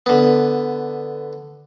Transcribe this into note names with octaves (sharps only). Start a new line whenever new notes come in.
D3 B3